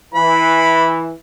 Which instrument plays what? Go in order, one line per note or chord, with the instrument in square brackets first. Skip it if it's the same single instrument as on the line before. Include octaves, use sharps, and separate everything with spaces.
[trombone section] E3 [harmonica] B5